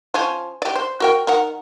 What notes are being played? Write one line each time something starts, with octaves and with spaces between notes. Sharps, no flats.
F3 C#4
G4 D5
C5
F#4 A#4 G5
D#3 A#4 F#5